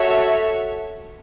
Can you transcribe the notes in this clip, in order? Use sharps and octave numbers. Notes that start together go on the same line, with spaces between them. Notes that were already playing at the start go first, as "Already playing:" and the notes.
Already playing: F#4 A4 C#5 E5